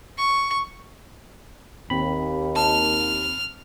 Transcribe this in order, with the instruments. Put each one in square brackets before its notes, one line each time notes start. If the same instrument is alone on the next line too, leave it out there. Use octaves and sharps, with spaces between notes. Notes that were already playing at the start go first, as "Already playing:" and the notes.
[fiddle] C#6
[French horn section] D#2 [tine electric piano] C4 B5
[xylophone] A5 [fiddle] F6